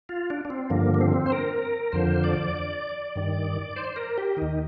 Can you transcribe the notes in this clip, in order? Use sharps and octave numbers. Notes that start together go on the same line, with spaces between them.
F4
D4
D4
C4
G2 D3 F3 A#3
A#3
C4
C5
A#4
F2 D3 F3 C5
D5
G2 D#3
C5
A#4
G4
D#2 D#3 D#4